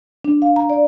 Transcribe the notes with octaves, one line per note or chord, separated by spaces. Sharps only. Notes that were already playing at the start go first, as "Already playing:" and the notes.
D4
F5
A#5
D5